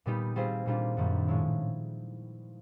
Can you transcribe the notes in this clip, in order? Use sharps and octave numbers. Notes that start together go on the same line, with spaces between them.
A#2 G3 B3 D#4 G4
G3 C4 F4 G#4 C5
A#2 G3 A#3 D4 F4
F#2 D#3 G3 A#3
A2 F3 G#3 C#4 E4